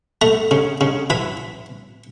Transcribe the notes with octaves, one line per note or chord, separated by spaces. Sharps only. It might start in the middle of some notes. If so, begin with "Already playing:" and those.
A3 A#5
C#3
C#3
E3 B5